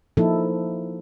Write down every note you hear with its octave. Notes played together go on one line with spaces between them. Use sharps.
F3 A#3 D#4 E4 A4